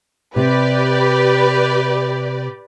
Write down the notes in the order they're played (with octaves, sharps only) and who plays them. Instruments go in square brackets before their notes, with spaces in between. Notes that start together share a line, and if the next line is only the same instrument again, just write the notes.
[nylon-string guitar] C3 [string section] G4 B4 D5